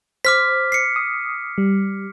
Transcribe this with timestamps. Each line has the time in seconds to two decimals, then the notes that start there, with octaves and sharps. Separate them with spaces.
0.25 C5 D6 F6 B6
0.72 C7 C#7
0.96 D#6
1.58 G3